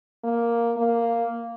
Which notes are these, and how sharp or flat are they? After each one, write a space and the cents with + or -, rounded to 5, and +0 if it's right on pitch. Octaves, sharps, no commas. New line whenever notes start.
A#3 +5
A#3 -5